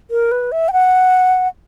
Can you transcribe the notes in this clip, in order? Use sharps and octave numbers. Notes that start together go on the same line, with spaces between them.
A#4
B4
E5
G5
F#5